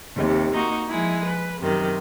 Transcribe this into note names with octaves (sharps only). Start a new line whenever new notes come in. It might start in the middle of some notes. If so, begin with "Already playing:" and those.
D#2 C3
A#3 D#4 F#4
F3 G#3 E4
B4
F#2 C3 D#3